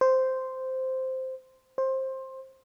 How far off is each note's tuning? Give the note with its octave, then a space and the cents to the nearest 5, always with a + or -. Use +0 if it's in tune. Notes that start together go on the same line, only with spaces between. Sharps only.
C5 -5
C5 +15